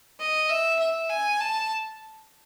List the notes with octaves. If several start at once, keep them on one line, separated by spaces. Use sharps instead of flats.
D#5
E5
E5
G#5
A5